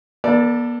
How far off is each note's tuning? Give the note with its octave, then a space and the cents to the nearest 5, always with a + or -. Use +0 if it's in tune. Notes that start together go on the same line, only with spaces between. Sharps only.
B3 -45 A4 +15 D5 +0